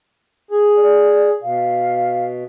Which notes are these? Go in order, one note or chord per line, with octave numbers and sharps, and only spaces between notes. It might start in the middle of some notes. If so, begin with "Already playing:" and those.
G#4
D5
B2 F5